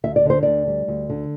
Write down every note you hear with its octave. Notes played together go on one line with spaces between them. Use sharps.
D2 E5
D5
D3 C5
D2 D5
G3
D2
D3